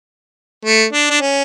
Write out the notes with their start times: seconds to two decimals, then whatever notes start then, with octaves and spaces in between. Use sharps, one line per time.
0.65 A3
0.93 D4
1.11 D4
1.21 C#4